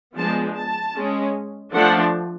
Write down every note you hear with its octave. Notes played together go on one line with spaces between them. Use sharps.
F3 G#3 B3 D4 A5
A5
G#3 C#4
F3 A3 D4 F#5